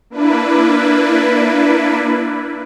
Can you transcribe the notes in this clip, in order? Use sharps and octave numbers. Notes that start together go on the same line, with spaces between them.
A#3 D4 E4 B4